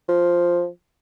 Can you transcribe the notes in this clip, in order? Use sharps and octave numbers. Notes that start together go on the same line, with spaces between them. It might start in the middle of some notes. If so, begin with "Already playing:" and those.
F3